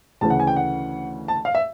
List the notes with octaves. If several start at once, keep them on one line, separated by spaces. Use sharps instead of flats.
D2 C#3 E3 A5
F#5
G#5
G5
F#5
A5
F5
E5